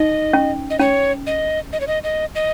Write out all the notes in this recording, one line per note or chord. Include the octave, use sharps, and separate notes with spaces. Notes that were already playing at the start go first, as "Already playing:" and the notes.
Already playing: D#4 D#5
C#4
D#5
C#4 C#5
D#5
D#5
C#5
D#5
D#5
D#5